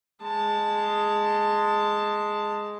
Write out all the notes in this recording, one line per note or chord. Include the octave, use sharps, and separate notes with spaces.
G#3 A5